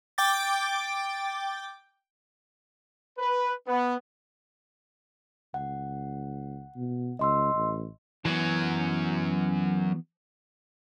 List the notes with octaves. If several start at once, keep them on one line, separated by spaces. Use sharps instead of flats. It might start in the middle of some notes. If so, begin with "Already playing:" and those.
G5 D6 A6
B4
B3
C#2 F#5
B2
C#2 D#5 C6 E6
A1
F#2 E3 F#3 B3